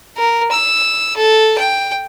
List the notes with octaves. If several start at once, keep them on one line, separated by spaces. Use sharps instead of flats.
A#4
E6
A4
G5